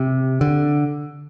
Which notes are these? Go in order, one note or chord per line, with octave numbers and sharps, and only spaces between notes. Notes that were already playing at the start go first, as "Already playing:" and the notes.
Already playing: C3
D3